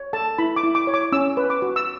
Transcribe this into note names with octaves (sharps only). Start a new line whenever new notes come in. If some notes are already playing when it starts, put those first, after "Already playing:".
Already playing: C#5
A4 A5
E4 B5
D6
E4
D6
C#5
D6
C#4 E6
B4
D6
F#4
E6